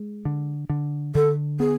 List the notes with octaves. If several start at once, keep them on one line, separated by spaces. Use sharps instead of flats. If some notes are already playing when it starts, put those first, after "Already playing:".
Already playing: G#3
D3
D3
D3 A4
B3 G#4